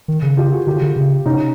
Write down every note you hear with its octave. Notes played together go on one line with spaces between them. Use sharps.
D#3
C#3
F4 G4
F#4 G#4
D3 F4 G4
D3
C#3
C3 C#4 D#4